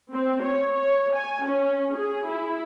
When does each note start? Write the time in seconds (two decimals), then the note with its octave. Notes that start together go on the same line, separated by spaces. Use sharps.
0.12 C4
0.43 C#5
0.75 C#5
1.15 G#5
1.47 C#4
1.96 G#4
2.30 E4